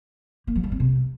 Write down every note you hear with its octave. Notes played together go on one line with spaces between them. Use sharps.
A#3
F#3
G3
C4
C3